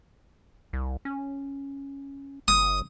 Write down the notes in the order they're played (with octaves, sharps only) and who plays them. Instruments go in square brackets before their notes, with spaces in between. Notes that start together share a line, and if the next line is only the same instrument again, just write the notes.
[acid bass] C2
C#4
[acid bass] G1 [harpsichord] D#6